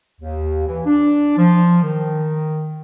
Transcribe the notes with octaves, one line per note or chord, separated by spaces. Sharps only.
D#2
E3
D4
F3
D#3